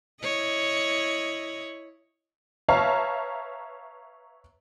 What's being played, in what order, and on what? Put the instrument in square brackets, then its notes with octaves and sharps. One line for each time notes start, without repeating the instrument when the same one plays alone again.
[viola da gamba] E4 C#5 D#5
[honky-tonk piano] B4 C#5 E5 F5 A5 A#5